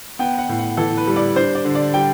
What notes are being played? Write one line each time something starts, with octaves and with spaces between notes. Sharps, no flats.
B3 G5
F#5
A2
F#5
E3 A4
B4
G3
D5
D4 C5
D5
D3
D5
G3 G5